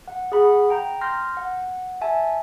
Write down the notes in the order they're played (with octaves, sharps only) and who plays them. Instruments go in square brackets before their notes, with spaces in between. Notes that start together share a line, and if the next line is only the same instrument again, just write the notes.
[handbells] F#5
G#4 F#5 B5
G5 A#5 G6
C6 F6 G6 A#6
F#5
E5 G#5 A5